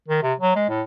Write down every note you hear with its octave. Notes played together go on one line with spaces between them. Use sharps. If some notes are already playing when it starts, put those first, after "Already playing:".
D#3
C3
F#3
G#3
A2